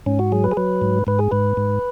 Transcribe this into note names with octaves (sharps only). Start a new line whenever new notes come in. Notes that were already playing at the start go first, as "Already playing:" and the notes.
G#2 C#4
F#4
F#3 G#4
B4
G#4
F#3 B4
G#2
G#2 B4
G#4
G#2 B4
G#2